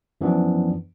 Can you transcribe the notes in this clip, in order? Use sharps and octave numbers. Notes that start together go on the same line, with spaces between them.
F#2 E3 F3 B3 D4